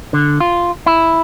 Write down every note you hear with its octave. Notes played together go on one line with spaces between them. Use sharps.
D3
F4
E4